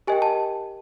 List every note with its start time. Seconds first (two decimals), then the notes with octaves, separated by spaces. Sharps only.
0.07 G4 A#4 D#5 G5 G#5
0.22 A5